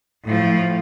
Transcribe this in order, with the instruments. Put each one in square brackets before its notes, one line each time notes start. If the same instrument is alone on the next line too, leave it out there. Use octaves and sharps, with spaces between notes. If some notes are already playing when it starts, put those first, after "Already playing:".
[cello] A2 F3